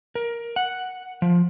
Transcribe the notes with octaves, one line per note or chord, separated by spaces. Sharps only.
A#4
F#5
F3